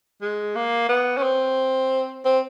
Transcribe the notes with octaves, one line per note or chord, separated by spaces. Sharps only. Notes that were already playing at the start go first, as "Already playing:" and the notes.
G#3
A#3
B3
C#4
C4
C4